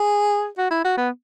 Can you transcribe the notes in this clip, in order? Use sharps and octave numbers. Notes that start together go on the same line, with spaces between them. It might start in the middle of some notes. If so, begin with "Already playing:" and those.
Already playing: G#4
F#4
E4
F#4
B3